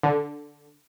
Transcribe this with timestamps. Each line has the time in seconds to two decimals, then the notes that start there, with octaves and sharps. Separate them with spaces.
0.03 D3